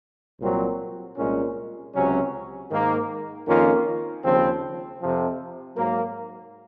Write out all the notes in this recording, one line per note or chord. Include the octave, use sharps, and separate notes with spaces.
C2 A#2 F#3 C4
C2 A#2 G#3 C#4
C#2 C3 F#3 C#4
G#2 D#3 A#3
F2 D#3 A#3 C#4 F4
D#2 C#3 F3 C4
F2 C3 F3
G#2 F#3 A#3